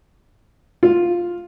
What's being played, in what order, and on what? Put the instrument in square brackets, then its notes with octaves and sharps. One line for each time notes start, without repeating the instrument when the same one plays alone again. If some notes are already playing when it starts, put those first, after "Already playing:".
[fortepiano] F4